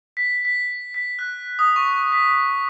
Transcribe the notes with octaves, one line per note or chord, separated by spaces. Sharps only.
B6
B6
B6
F#6
D#6
C#6
B6